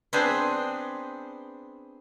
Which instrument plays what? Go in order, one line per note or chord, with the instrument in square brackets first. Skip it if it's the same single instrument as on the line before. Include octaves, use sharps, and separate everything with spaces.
[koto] B3 C4 D4 G#4 C5